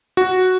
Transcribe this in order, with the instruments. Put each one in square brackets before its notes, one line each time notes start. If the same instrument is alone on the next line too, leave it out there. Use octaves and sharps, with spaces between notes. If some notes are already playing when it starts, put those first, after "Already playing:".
[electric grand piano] F#4